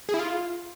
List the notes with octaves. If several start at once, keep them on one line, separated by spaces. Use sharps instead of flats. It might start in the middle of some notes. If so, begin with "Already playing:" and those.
G#4
E4
F4